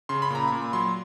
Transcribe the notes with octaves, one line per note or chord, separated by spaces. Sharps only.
C#3 C6
B5
A#2 A#5
A#2 B5
F#3 C6